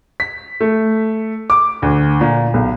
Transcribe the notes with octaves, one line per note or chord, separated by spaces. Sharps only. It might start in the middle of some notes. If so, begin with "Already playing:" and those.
B6
A3
D6
D2
A#2
B1